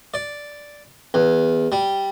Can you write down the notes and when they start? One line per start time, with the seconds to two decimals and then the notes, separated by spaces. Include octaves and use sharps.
0.14 D5
1.14 E2
1.72 G3